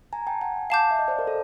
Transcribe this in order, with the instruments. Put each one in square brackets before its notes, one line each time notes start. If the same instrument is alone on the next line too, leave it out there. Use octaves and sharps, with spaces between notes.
[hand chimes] G#5 A#5
G5 A5
F#5 G#5
[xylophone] F5 A5 D6 G6
[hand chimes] E5
D#5
C5 D5
A#4 C5
A4